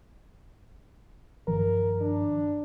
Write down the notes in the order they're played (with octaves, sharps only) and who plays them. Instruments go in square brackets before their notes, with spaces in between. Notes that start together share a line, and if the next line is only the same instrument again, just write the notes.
[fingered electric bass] G2 D#3 F3 [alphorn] A#4
[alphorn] D4